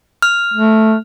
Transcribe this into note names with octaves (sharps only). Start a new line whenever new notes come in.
F6
A3